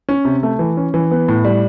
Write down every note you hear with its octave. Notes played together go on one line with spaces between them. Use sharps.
C#4
C3
A3
E3
C#4
E3
B3
A2
G3